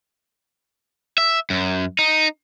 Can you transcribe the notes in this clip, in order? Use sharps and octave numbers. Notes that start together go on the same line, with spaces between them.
E5
F#2
D#4